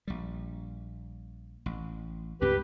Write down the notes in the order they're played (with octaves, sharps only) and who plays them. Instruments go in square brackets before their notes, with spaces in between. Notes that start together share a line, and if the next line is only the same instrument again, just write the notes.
[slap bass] A#1 G3
A1
[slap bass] C#2 G2 C4 [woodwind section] G4 B4